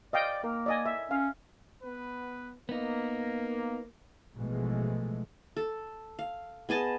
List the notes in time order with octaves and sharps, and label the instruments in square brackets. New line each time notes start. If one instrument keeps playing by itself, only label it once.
[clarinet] D5 [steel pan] D#5 F5 G5
[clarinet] A#3 [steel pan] A#4
[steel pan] D5 D#5 G#5
E5
[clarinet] C#4 [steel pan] F5
[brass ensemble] B3 B4
[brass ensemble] A#3 [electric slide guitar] B3 D#4
[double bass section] A1 B2 E3 F3 G#3 A3
[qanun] A4
F5
B3 G#4 D#5 A5